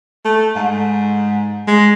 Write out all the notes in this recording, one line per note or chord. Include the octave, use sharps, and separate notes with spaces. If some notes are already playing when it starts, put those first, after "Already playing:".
A3
G#2
G#3